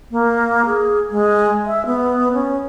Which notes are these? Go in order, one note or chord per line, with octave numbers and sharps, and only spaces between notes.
A#3
G#4
G#3
E5
B3
C#4